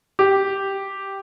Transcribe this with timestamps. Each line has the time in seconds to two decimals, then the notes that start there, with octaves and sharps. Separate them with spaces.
0.19 G4